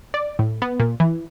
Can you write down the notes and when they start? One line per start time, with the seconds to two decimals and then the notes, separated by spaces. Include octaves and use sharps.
0.14 D5
0.39 A2
0.62 B3
0.80 A#2
1.00 E3